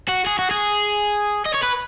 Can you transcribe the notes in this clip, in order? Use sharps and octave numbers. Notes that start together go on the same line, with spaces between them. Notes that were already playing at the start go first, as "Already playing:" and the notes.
F#4
G#4
F#4
G#4
D#5
C#5
B4